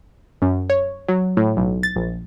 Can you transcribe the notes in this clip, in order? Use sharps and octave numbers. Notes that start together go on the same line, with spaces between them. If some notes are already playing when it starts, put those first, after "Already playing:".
F#2
C#5
F#3
A2
B1
A6
A#1